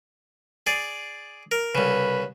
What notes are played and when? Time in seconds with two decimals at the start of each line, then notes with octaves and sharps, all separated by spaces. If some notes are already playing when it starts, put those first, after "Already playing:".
0.67 G#4 D5
1.51 A#4
1.75 C2 C#3 B4